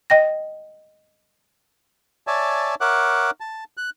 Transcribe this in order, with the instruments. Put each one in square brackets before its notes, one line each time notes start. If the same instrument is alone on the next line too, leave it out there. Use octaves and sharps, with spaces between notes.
[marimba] D#5 G5 A#6
[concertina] C#5 D5 E5 G#5 A5
A#4 C#5 E5 F#5 D6 F#6
A5
F#6